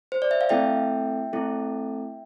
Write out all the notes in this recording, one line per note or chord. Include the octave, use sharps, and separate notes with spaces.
C5
D5
E5
F5
A3 C4 E4 A4 E5 G5
A3 C4 E4 A4